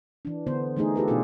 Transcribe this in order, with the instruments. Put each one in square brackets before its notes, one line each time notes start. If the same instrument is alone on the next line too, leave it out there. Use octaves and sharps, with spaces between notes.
[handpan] E3 D4
D3 B3 C5
E3 A3 D#4 G#4
F4 G4 A4 B4
B2 B3 D4 D#4 F4 G#4